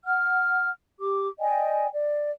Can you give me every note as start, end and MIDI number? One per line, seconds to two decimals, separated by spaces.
0.05 0.69 78
0.05 0.69 89
0.99 1.27 67
0.99 1.27 86
1.39 1.86 74
1.39 1.86 75
1.39 1.86 79
1.39 1.86 80
1.92 2.30 74